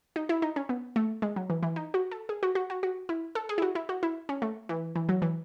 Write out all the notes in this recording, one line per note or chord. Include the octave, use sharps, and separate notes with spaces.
D#4
E4
D#4
C#4
B3
A3
G#3
F#3
E3
E3
D#4
F#4
A4
G#4
F#4
F#4
F#4
F#4
E4
A4
G#4
E4
F#4
E4
F#4
E4
C#4
A3
E3
E3
F#3
E3